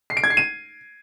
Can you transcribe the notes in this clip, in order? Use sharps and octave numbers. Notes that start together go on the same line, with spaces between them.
C7
D7
G#6
C7
D#7